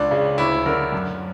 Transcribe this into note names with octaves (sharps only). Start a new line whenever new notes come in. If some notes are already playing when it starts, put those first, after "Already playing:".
Already playing: C#2 D4
C#3
D2 E4
D3 A#4
F#2